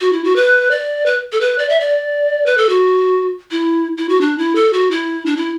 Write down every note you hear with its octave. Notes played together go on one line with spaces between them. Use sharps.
F#4
E4
F#4
B4
D5
B4
A4
B4
D5
E5
D5
B4
A4
F#4
E4
E4
F#4
D4
E4
A4
F#4
E4
D4
E4